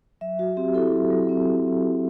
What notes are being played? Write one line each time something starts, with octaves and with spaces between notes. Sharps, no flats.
F#3 E5
F#3 F#4
C4 G4
E4 A4
F#3
F#3
C4